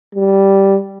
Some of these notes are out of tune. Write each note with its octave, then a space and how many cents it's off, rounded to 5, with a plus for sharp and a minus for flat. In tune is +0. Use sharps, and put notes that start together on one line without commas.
G3 -5